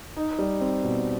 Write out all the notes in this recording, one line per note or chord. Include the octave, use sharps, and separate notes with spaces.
D#4
G3
C4
B2